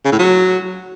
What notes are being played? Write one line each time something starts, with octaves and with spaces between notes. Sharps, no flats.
C#3
A2
F#3